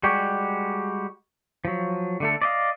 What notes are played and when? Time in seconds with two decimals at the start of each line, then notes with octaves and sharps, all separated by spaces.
0.03 G3 G#3 F#4 G4
1.65 F3 F#3
2.20 D3 A3 A4
2.42 D5 D#5 F5